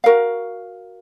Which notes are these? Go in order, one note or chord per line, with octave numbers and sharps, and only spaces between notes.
F#4 A#4 F5